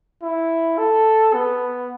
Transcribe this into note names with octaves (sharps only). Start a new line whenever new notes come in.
E4
A4
B3